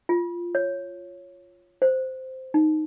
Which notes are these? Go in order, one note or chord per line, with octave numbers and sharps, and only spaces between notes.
F4
C#5
C5
D#4